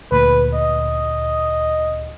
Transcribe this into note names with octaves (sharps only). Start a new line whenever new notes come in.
D2 A#2 B4
D#5